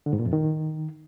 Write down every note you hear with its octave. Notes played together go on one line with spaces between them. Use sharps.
D3
G#2
A#2
F2
D#3